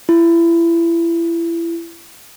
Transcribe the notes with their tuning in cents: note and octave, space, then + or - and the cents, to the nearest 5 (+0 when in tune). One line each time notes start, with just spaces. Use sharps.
E4 +30